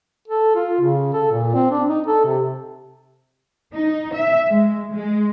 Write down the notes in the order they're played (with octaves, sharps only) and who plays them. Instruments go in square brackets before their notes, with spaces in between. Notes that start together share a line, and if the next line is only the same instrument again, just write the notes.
[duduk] A4
F4
C#3
A4
A#2
C4
D4
D#4
A4
C3
[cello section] D#4
E5
G#3
G#3